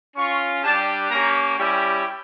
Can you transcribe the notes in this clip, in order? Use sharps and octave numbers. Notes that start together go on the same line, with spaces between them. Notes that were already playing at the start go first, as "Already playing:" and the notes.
C#4 F4 C#6
G3 D4 G4 A5
A#3 C#4 G4 A#5
G3 C#4 E4 G4